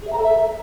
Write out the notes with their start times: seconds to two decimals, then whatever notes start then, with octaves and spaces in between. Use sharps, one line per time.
0.02 G#4
0.07 E5
0.12 A#5
0.18 A4
0.23 E5